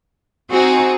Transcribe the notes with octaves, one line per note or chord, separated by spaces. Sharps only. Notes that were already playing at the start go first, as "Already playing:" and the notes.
C4 D#4 F#4 G#4